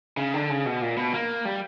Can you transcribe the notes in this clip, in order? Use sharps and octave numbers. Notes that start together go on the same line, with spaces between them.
C#3
D3
C#3
B2
A#2
B2
A#3
G3